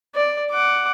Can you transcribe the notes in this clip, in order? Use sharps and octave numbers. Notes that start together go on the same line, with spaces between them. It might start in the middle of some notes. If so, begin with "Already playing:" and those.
D5
F#5 D6